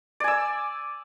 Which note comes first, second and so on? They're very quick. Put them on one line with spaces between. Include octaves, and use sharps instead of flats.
D5 G#5 E6